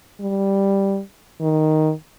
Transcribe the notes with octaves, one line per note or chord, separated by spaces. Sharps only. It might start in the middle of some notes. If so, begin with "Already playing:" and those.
G3
D#3